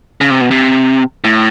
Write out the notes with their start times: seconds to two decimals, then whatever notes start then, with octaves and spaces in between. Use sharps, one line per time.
0.21 C#3
0.30 C3
0.41 B2
0.51 C3
1.24 A2